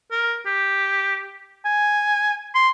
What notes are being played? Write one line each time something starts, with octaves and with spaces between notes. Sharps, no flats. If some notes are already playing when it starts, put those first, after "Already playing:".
A#4
G4
G#5
C6